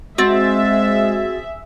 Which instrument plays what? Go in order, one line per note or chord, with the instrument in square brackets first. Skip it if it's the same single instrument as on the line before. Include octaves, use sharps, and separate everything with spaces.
[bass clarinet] G#3 [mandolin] C4 [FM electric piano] F#4 A6 [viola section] G#4 E5